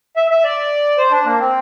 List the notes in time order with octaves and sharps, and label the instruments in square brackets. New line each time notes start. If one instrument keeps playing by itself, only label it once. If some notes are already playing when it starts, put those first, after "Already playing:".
[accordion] E5
E5
D5
C5
D4
A#3
C4